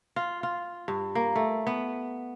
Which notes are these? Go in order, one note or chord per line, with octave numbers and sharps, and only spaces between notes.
F4
F4
G2
A#3
A3
B3